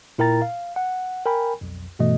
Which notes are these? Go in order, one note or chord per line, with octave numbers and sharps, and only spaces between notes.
A#2 E4 A#4 G5 A#5 A6
F5
F#5
A#4 G5 G#5 B5
B1 F2
G2 B2 E3 A3 D#5